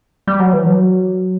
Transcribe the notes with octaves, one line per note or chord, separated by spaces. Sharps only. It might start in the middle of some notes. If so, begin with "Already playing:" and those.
G3
F#3
E3
F#3